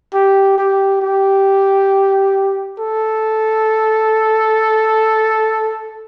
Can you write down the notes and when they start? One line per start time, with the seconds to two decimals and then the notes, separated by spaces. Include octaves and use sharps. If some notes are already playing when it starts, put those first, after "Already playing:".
0.14 G4
0.58 G4
1.02 G4
2.79 A4